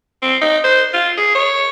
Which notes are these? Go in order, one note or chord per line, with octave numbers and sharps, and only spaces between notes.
C4
D#4
C5
F4
G#4
C#5